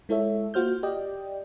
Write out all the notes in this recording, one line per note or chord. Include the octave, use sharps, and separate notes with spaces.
G#3 E4 A4 C#5 E5
A#3 F4 F#4 C5 F6 G6
G4 D5 D#5 G5